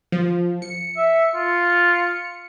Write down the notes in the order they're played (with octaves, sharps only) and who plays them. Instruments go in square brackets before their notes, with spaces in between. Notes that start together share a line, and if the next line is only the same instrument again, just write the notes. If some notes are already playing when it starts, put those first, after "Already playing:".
[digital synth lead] F3
C#7
[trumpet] E5
F4